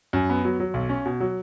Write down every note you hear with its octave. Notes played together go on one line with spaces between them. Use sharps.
F#2
B3
F#3
F#3
B1
C#4
B2
F#3